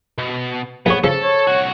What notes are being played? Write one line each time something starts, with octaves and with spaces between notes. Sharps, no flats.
B2
A#1 B3 G#4 C#5
C#3 F3 A4 A5
C#5
C2 F#4